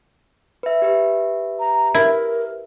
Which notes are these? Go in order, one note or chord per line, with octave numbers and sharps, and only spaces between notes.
B4 E5
G4 B4 E5
A#5
E4 A#4